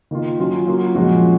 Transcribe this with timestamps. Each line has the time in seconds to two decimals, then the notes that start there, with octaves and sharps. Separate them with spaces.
0.11 D#3 A#3 F4
0.39 F#3 C#4 F4
0.67 F#3 A#3 F4
0.95 A#2 F3 G#3 C#4 F#4